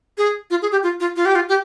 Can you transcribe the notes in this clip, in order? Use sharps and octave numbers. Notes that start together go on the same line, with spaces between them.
G#4
F4
G#4
G4
F4
F4
F4
G4
F4
G4